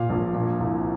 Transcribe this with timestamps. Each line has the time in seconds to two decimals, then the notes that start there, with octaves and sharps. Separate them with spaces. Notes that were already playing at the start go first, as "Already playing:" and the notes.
Already playing: A#2 F5
0.10 A#1
0.34 A#2
0.60 C2